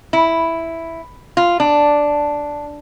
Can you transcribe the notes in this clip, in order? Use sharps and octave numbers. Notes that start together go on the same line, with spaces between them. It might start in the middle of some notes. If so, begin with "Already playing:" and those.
E4
F4
D4